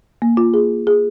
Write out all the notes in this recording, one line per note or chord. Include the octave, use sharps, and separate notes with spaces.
A#3
F4
G#4
G#4